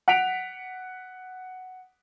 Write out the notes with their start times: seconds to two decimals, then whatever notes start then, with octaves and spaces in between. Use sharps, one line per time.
0.08 F#5 B6 D7 F7